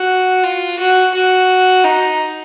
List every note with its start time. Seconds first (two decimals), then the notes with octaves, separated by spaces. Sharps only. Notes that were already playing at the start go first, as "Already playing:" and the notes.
Already playing: F#4
0.44 F4
0.79 F#4
1.14 F#4
1.84 D#4